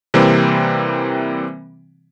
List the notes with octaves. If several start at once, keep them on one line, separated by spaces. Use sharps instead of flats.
C3 E3 G3 A#3 C4